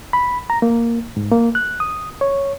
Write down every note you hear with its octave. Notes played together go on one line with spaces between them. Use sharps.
B5
A#5
A#3
G#2
A#3
F#6
D#6
C#5